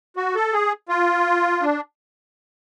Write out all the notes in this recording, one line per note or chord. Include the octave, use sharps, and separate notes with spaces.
F#4
A4
G#4
F4
D4